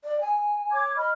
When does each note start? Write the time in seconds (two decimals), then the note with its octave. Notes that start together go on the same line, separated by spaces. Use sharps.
0.04 D5
0.21 G#5
0.72 C#5 D6 G#6
0.96 D#5 B5 F6